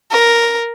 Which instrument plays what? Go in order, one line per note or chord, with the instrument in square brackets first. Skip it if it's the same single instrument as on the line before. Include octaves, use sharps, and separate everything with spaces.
[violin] A#4